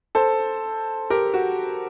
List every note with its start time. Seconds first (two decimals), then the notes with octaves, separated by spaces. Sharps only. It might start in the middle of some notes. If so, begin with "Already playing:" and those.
0.15 A4 C5
1.10 G4 A#4
1.34 F#4